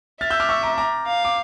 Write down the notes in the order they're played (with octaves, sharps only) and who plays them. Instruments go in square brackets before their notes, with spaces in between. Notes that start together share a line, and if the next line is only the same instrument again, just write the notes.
[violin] E5 [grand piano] F6 A6
[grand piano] E6 G6
D6 F6
C#6 E6
A#5 D6
A#5 D6
[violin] F5
[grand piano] D6